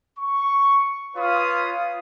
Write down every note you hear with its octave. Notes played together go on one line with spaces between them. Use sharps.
C#6
F4 B4 C#5 F5 D#6